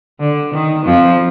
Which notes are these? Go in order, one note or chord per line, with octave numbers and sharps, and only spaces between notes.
D3
D#3
F2 F3